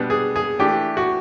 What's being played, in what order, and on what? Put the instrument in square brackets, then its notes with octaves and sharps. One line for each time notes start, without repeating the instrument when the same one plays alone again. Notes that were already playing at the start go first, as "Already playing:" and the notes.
Already playing: [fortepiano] B2 G3 B3 D4
G#4
G#4
E3 A3 D4 G4
F#4